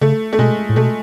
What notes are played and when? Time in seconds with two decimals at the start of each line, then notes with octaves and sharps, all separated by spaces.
0.01 C#3 A3
0.33 A3
0.39 B2 G#3
0.69 A2
0.76 B2 A3